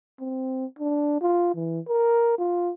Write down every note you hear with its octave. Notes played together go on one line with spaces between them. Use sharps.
C4
D4
F4
E3
A#4
F4